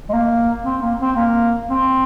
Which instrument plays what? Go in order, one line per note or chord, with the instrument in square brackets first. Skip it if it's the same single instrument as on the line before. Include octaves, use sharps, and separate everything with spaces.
[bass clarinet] G#3
A#3
C4
A#3
C4
A#3
C4